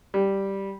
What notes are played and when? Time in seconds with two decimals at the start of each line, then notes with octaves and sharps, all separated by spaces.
0.14 G3